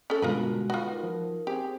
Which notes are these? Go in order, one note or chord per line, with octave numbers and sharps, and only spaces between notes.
C#4 A4 A5
G2 B2 D3 G#3 F4 F#4 A#4 B4
F4 F#4 B4
D#4 A#4
F3
C4 G4 G#4